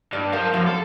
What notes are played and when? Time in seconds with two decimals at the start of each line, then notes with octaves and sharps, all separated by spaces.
0.13 G2 D5
0.33 A#4 F5 A5
0.53 F#2 F3 E5 F5
0.67 A4